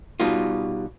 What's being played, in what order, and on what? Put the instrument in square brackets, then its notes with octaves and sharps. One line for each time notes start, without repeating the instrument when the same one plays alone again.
[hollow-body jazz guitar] B2 G3 D#4 F4